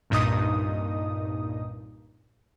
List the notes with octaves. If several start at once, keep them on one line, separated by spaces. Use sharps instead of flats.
C2 G2 A#2 D#4 D#5 D#6